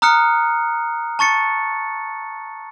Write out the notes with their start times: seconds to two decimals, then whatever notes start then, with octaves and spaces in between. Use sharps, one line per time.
0.02 A#5 D#6 F6 F#6 C#7
1.19 A5 C#6 A6 C#7